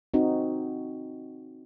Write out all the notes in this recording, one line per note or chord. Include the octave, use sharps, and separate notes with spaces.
C4 D#4 F#4